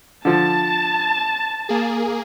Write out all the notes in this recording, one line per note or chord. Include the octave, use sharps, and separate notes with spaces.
D3 F3 A5
A#3 G#4